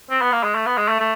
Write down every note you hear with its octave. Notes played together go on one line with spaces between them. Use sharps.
C4
B3
A#3
G#3
A3
B3
G#3
A3
A3